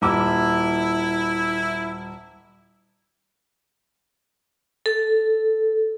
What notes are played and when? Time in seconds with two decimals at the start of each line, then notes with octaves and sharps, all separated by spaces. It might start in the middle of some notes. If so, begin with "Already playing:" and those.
0.02 D#1 E4 D6 E6
4.86 A4